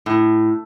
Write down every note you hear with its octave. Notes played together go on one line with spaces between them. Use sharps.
A2